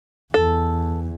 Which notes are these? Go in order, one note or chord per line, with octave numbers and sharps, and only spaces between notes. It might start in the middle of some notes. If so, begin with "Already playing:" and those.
E2 A4